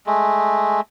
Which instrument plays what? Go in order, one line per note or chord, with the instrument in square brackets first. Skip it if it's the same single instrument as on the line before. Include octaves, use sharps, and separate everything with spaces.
[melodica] G#3 A3